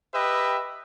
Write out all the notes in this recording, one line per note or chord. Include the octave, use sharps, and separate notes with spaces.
G4 B4 D#5 E5